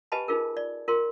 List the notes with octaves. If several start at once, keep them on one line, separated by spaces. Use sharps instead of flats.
G4 B4 D#5 G#5 A5 B5
D#4 F4 G#4 A#4
D5
F4 A#4 C6